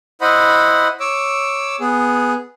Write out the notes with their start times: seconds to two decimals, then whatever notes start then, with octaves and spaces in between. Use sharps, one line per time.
0.21 E4 C5 D#5 F#5 B5
1.00 C#5 D6 E6
1.80 B3 G#4